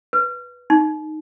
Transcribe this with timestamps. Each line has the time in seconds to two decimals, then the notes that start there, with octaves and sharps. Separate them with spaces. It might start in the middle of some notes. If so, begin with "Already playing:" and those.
0.13 B4
0.70 D#4